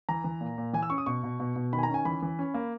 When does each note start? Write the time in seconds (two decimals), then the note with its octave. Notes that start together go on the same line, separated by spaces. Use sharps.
0.09 E3 A#5
0.24 E3
0.41 A#2
0.58 A#2
0.73 E3 G#5
0.82 E6
0.90 C#4 C#6
0.98 D#6
1.06 B2 C#6
1.23 B2
1.40 B2
1.56 B2
1.73 D#3 B5
1.78 G#5
1.83 A#5
1.89 C#4 G#5
2.05 E3 B5
2.22 E3
2.39 C#4
2.54 A#3